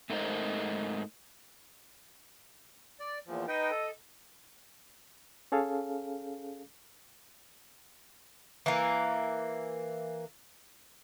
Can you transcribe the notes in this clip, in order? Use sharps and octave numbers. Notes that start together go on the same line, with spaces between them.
G#2 A3 D#4 A#4 C5 D#5
D5
E2 A#2 F3
D#4 B4 D#5 G5
A4
C#4 G#4 A4 F5
E3 A#3